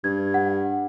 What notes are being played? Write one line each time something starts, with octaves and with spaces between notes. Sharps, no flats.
G2 G#6
F#5